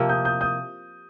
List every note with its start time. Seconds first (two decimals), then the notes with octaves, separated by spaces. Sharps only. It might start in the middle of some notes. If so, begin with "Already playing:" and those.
Already playing: C3 F3 A#3
0.09 D#6 G6
0.25 D#6 G6
0.41 D#6 G6